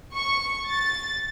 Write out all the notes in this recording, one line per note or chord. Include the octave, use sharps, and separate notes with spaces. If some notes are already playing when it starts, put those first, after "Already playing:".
C#6
A6